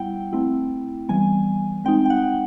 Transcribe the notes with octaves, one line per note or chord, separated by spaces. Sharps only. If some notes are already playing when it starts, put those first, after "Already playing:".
Already playing: G3 B3 E4 F#5 G5
A3 C4 E4
E3 G3 B3 G#5
G#3 C4 D#4 G5
G5
F#5